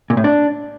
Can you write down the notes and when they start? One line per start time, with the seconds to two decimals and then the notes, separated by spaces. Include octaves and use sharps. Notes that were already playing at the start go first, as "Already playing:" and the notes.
0.10 A#2
0.17 A2
0.24 D4